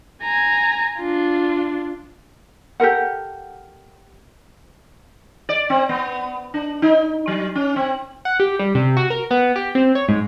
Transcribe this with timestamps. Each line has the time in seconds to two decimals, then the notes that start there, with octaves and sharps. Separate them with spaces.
0.22 G#5 A#5
0.98 D4 F4
2.80 G4 A4 A#4 F#5
5.49 D5
5.70 C4
5.89 B3
6.54 D4
6.82 D#4
7.27 F#3
7.55 C#4
7.76 C4
8.25 F#5
8.40 G4
8.59 G3
8.75 C3
8.97 F#4
9.10 A#4
9.31 B3
9.56 G4
9.75 C4
9.95 C#5
10.09 G#2